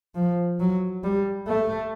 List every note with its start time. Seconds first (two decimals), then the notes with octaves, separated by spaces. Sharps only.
0.15 F3
0.60 F#3
1.04 G3
1.48 A3